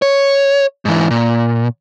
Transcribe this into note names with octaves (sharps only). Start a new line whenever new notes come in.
C#5
G#2 E3
A#2